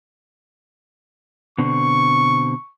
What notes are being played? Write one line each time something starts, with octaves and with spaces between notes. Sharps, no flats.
B2 D3 C4 C#6